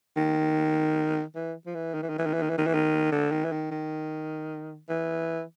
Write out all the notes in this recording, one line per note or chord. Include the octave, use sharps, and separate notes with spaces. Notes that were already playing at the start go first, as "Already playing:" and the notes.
D#3
E3
F3
E3
D#3
E3
D#3
E3
D#3
E3
D#3
E3
D#3
E3
D#3
D3
D#3
E3
D#3
D#3
E3